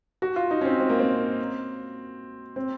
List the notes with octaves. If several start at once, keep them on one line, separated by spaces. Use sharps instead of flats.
F#4
F4
D#4
C#4
C4
C4
A#3
C4
C4